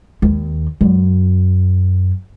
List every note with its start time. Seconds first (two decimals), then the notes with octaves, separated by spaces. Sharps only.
0.22 D#2
0.81 F#2